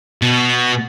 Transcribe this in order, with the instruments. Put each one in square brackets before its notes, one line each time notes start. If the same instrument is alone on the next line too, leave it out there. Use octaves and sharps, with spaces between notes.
[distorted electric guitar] B2 B3